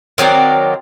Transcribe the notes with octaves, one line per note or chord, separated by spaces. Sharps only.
D#3 F#3 C4 D5